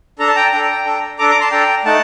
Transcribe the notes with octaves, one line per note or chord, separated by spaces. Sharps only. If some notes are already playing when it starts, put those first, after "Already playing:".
D4 A4 A#5
A5
G5 A#5
D4 A4 G5 A#5
D4 A4
D4 A4 A#5 D6
A#5 D6
A5 C6
D4 A4 G5 A#5
A3 D#4 F#5 A5